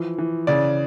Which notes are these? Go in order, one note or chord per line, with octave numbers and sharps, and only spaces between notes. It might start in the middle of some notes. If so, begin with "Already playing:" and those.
Already playing: E3 F3
E3
C#3 D5